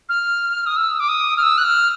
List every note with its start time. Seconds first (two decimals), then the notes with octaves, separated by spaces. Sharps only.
0.09 F6
0.66 D#6
0.76 E6
1.00 D6
1.09 D#6
1.37 F6
1.43 E6
1.58 F#6
1.64 F6